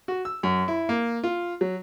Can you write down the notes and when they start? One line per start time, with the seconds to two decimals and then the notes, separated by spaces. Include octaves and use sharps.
0.08 F#4
0.25 E6
0.43 F#2
0.68 E4
0.89 A#3
1.24 F4
1.61 F#3